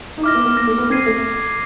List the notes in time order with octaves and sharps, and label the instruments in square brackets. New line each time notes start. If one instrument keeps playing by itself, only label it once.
[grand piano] D#4
[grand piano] E4 [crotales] D6 F6 A#6
[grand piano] B3
B3
[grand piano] A#3 [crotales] D6 F6 A#6
[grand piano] A3
B3
[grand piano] C4 [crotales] F6 G#6 C7 D#7
[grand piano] A3